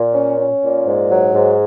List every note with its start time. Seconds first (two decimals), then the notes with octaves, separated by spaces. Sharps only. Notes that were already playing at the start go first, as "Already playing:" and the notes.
Already playing: A#2
0.14 C#4
0.38 C#4
0.63 A#2
0.86 G#2
1.10 F#3
1.34 G#2